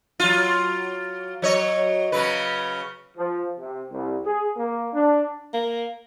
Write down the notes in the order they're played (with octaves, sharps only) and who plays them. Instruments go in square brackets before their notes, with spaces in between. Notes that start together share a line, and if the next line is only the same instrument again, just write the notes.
[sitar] F#3 F4
F#3 C#5 D#5
C#3 F#3 B4
[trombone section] F3
C3
C2
G#4
A#3
D4
[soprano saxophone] A#3